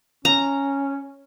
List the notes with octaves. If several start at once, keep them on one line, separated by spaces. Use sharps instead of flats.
C#4 A#5